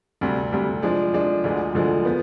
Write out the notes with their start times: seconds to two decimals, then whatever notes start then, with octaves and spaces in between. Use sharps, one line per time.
0.21 D2 C3 G3
0.52 D2 C3 G3
0.83 F3 G#3 D4
1.14 F3 G#3 D4
1.44 D2 D3 F3 G#3
1.75 D2 D3 F3 G#3
2.05 F3 B3